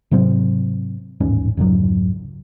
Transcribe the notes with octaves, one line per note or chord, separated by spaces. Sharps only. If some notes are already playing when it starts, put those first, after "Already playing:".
G#2 C3 F#3 C4
D#1 A1 G#2 C#4
F1 C#2 G#2 F#3